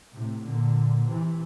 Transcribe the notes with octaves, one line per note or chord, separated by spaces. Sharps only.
A2 C3
A#2 D3
C3 E3